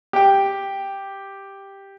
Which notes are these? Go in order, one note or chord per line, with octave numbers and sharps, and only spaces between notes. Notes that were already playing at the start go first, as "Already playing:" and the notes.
G4 G5